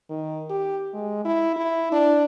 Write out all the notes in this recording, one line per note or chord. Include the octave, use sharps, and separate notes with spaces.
D#3
G4
G#3
E4
E4
D4